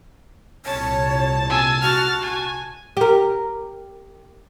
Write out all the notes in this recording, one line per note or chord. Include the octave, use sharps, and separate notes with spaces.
C2 A#2 C#5 A5
G#5 E6
F#4 F6 A6
G#5
G4 A#4